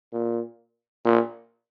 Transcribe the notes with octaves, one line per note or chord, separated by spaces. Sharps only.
A#2
A#2